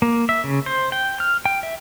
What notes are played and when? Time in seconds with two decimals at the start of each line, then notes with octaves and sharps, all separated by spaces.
0.02 A#3
0.29 E5
0.44 C#3
0.66 C5
0.92 G5
1.20 F6
1.45 G5
1.63 E5